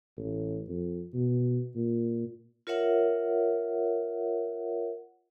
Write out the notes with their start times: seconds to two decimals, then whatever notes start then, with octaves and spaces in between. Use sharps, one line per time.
0.17 A1
0.68 F2
1.14 B2
1.75 A#2
2.67 F4 A#4 C#5 E5 F#5